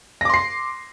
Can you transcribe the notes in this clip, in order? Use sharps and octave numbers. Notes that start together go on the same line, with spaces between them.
C6 D6 A#6 C7